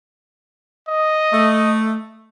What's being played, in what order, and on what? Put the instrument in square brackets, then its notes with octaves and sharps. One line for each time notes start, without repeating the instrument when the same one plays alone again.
[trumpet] D#5
[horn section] A3